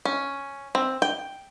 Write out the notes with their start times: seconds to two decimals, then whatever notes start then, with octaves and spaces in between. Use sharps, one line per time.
0.05 C#4
0.75 C4
1.02 G5